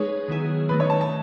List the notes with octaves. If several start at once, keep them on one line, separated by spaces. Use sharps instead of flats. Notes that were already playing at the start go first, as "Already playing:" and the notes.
Already playing: G#3 D#4 G#4 B4 C#5
D#3 F#3 B3 E4 G#4
D#3 A3 D#4 B4
C#5
A5
A5